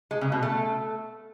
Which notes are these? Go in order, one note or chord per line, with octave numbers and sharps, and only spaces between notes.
G#3
C#3
B2
A3